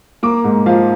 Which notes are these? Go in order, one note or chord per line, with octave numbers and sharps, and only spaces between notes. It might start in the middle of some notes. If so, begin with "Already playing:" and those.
A#3 D6
G#2
F3 F5